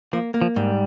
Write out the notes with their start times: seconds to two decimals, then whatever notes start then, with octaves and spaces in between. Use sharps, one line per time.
0.13 F3 A#3
0.34 A#3
0.42 F3
0.56 G#2 G3